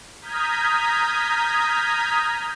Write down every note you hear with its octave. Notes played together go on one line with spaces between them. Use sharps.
A#5 D#6 F6 G6 G#6 B6